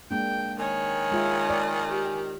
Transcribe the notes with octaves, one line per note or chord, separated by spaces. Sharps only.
G#3 A#3 D4 G5
D#3 C#5 G#5
G#3 F4 E5
D5
G4